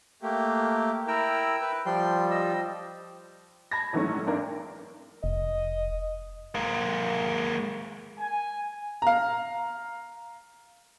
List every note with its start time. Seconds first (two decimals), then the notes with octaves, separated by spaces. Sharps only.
0.22 A3 A#3 G4
1.08 E4 A#4 G5 E6
1.61 B4
1.86 F3 G3 G5 C6
2.30 G4 D#5 E6
3.71 A5 B5 G#6 A#6
3.93 D#3 E3 F#3 G#3 A3 C#4
4.26 G#1 D4 A#4
5.24 F1 D#5
6.55 G#3 A#3
8.19 G#5
9.02 F5 A#5